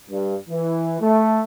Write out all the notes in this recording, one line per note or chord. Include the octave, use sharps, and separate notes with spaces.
G2
E3
A3